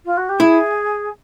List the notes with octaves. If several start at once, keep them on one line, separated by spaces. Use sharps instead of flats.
F4
F#4
G4
E4 G#4